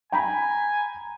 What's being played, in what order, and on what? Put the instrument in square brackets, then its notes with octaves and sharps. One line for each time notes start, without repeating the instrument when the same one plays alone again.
[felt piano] G5 A#5 B5 [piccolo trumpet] G#5